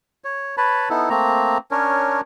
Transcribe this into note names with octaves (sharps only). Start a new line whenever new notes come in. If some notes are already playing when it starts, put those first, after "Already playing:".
C#5
B4 C#5 A5 B5
B3 D#4 E4 A4
A3 A#3 C4 A#5
C#4 D4 A#4 C#5